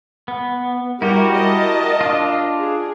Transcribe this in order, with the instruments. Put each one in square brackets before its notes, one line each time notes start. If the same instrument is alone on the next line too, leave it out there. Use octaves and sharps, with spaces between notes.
[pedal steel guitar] B3
[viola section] G3 A#4 [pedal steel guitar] E4 F#4 G4
[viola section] A#4 D#5 A5
[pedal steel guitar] D4 F4
[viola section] G#4